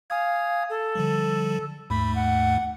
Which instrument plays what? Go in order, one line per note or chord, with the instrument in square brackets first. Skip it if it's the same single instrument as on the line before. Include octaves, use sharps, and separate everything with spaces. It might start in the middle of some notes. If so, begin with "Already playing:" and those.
[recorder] F5 [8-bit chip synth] G#5 D#6 G#6
[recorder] A4
[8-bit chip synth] D3 F3 G3
[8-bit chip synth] D#2 G#2 A3 [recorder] B5
[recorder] F#5